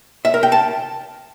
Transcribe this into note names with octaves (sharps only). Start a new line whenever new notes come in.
E5
A#4
G5
A5